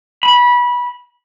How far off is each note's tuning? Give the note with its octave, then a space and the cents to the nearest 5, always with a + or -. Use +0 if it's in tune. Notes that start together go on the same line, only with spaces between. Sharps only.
B5 -20